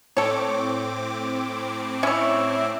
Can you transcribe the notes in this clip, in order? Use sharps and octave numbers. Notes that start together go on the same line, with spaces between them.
A2 C4 A4 C#5 D6
C#4 E4 C#5